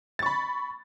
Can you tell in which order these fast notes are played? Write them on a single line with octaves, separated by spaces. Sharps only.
A6 C#6 B5